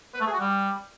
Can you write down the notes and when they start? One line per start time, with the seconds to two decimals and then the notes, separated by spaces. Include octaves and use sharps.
0.14 B4
0.20 A3
0.27 G#4
0.33 F#4
0.39 G3